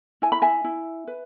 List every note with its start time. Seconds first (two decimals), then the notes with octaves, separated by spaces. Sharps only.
0.22 E4 G#5
0.32 B5
0.42 E5 G#5
0.64 E4
1.07 B4